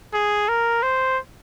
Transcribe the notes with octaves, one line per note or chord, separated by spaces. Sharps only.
G#4
A#4
C5